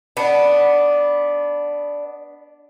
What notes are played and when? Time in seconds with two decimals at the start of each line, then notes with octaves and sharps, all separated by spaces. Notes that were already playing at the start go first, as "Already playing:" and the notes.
0.17 B3 D4